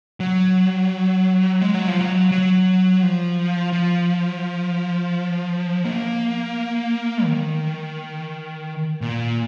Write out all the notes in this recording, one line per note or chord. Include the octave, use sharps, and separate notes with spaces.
F#3
G#3
F#3
F3
F#3
F#3
F3
F3
A#3
D#3
A#2